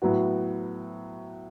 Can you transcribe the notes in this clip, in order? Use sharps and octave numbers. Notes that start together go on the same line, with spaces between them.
A2 F#3 B3 F#4